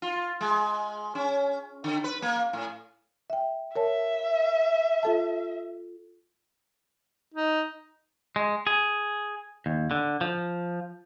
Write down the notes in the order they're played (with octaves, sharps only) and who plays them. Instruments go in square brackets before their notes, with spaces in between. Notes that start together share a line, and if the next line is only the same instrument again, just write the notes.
[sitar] F4
G#3
C#4
D3
B4
A#3
A2
[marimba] E5 G5
[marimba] A#4 C#5 A5 [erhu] E5
[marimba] F4 A4 A5
[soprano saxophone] D#4
[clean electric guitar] G#3
G#4
D#2
D3
F3